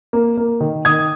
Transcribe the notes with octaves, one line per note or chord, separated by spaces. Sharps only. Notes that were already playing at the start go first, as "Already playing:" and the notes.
A#3
A#3
D#3
D#3 D#6 G#6